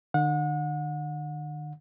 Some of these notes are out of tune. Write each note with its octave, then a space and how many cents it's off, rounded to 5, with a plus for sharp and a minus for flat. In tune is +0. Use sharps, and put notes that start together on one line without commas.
D3 +45 F#5 -35